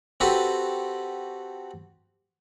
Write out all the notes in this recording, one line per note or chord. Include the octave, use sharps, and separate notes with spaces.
C4 F#4 G4 A4 B4